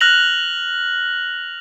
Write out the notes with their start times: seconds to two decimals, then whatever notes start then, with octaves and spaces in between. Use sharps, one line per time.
0.01 F6 F#6 A#6 F7 F#7